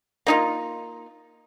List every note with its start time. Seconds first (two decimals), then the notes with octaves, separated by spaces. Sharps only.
0.27 A#3 D#4 F4